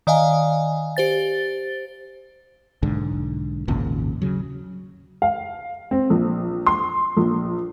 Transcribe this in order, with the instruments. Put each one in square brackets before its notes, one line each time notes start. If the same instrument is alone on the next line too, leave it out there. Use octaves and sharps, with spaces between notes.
[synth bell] D#3 D5 D#5 F5 G#5
G4 C5 A6
[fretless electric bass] B1 G#2 D3
G#1 D#2 A#2 C#3
C#3 F#3
[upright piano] F5
C4
A#1
C6
A#1